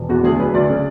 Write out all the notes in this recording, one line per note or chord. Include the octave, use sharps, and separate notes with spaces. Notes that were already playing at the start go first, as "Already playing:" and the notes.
Already playing: E1
E2 F#4
D2 G#4
F#3 B4
D2 D5
C#3